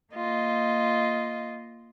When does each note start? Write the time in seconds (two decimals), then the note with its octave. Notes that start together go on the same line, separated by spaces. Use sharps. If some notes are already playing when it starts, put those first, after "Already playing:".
0.13 A#3 F4 D#5